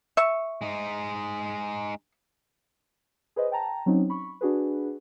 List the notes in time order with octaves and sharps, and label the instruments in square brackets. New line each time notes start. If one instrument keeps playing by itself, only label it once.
[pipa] E5 C#6
[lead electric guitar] G#3 D#4
[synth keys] G#4 B4 C5 D#5
G5 A5 A#5
F#3 C4 C#4 D#4
B5 C#6
D4 F#4 G#4 B4